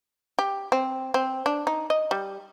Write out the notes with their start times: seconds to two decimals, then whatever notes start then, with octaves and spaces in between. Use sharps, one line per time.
0.39 G4
0.72 C4
1.14 C4
1.46 D4
1.67 D#4
1.90 D#5
2.11 G3